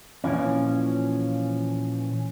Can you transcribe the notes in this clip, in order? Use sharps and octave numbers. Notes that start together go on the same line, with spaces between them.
A#2 E3 F3 C#4